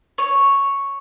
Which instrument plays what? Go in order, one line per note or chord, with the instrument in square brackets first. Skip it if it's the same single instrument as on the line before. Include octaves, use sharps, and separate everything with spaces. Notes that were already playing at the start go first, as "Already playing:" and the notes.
[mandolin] C#5